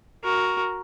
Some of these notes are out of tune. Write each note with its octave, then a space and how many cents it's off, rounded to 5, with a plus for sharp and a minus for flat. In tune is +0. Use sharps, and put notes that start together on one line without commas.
F#4 +0 A#4 +5